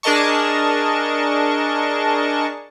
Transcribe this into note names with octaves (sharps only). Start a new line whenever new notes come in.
D4 G#4 A#4 D#5 A5 C#6